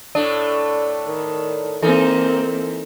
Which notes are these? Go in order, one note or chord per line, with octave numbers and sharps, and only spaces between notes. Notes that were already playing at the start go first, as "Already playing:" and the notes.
A2 A3 D4 D5
D#3
E3 A#3 C4 D#4 A4